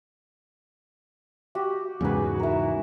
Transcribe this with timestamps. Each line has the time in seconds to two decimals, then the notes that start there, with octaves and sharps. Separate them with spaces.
1.55 F#4 G4
2.01 E2 G#2 C#3 D#4 F#4 G#4 B4
2.40 E4 A#4